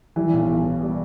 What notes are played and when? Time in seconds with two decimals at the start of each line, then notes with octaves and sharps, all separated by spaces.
0.16 E3 G3
0.33 B1
0.49 B1
0.66 B2
0.83 G3